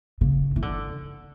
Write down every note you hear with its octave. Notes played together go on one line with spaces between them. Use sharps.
C#3
E3
D3